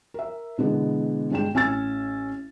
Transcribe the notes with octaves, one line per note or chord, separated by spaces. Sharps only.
A#4 E5
B2 D3 E3 G#3 B3
G2 G#3 D4 G5 E7
A1 C#4 G#5 E6 A6